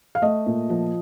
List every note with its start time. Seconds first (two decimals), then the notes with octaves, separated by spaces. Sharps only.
0.15 F5
0.22 A3 D#5
0.46 A#2
0.70 F3